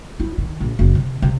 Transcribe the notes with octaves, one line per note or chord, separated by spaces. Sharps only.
E4
D#3
A#1
F#1
C3
C3